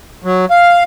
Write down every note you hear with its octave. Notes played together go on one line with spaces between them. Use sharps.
F#3
F5